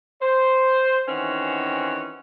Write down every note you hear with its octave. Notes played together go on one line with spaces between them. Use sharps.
C5
D#3 E3 C4 C#4 F#4